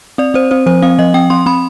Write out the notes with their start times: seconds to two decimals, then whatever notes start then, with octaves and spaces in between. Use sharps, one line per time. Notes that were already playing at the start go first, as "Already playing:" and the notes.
0.18 C4 D5
0.34 C4 C5
0.51 C4 C5
0.66 F3 C5
0.82 C4 F5
0.99 F3 D#5
1.14 C4 G5
1.30 C4 C6
1.46 C4 B5